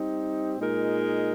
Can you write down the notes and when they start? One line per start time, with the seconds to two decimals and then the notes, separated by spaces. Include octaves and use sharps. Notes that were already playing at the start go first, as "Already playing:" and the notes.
Already playing: G3 C4 D#4
0.59 A#2 G#3 D#4 A#4